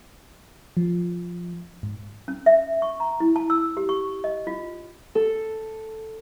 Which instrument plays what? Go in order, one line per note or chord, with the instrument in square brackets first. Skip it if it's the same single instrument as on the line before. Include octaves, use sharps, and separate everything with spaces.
[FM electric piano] F3
G#2
[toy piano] C#4
E5
C#6
A#5
E4
A5
E6
G4
C#6
D#5
F4
[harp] A4